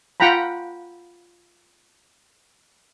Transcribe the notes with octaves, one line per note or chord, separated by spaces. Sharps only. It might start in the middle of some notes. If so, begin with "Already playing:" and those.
F4 F#5 G5 A#5 B5